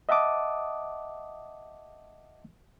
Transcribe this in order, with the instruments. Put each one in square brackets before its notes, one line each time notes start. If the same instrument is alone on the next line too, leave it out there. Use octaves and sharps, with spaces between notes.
[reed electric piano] D#5 E5 F#5 A5 D6 D#6